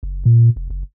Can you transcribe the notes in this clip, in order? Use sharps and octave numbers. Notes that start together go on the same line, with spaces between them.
F#1
A#2
F1
F#1